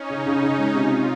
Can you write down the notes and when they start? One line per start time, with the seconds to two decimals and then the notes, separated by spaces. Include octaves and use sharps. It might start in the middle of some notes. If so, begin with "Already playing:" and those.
Already playing: C#4 D#4
0.10 C#3
0.26 C#3
0.42 C#3
0.59 G#3
0.75 C3 F4
0.92 D#4